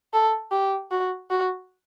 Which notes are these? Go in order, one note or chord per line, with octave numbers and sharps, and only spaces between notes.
A4
G4
F#4
F#4